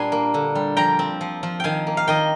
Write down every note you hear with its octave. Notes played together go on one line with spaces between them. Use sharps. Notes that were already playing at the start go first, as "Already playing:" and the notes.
Already playing: A#2 G3 D4 G#5 A#5 C6
A#3
D3
G3
F3 G5 A#5
C4
F3
F3
D#3 F5 G5 G#5
A#3
F5
D#3 D#5 G5